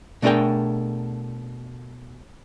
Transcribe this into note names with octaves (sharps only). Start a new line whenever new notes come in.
B2 A3 D4 G#4 A#4 G5